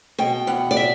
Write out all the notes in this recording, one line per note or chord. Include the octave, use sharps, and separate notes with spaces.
B2 G5
E2 F#5
D5
E5